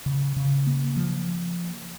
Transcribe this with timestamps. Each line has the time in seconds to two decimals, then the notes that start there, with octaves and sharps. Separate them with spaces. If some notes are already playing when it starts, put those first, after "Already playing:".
0.06 C#3
0.36 C#3
0.67 A#3
0.96 F3